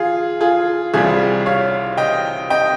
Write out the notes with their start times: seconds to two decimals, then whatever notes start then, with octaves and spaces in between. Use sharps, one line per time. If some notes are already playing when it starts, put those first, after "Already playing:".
Already playing: F4 G#4
0.41 F4 G#4
0.94 C2 C3 G3 F4 G#4
1.46 C#5 F5
1.97 D#5 G5
2.50 D#5 G5